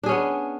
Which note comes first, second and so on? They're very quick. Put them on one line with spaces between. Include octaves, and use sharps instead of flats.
D4 G#4 C#4 B3